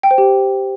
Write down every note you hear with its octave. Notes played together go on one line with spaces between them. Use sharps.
G5
C5
G4